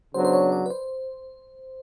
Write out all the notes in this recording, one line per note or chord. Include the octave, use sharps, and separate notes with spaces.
C#3 F#3 B3 D4 C5
C5
C#5
D5
B4
C5